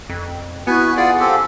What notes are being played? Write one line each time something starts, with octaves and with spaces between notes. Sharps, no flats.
F2
B3 E4 F#4 B4 G#5 F#6
F4 G#4 D5 F5 F#5 G#5
C4 G4 A4